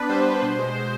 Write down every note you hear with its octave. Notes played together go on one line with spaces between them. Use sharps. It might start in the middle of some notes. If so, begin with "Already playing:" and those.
Already playing: B3 D4 B4
G3 C5
G3
B2
G#3
B2